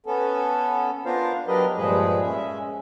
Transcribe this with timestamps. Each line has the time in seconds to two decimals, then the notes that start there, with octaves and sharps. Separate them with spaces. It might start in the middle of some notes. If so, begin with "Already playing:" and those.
0.06 B3 C#4 A4
1.05 B3 D4 F4 A#4 C5 F5
1.47 F#3 D4 G4 A#4 B4 D#5
1.77 G2 A#2 F3 G#3 G#4 B4
2.22 G#3 C#4 E5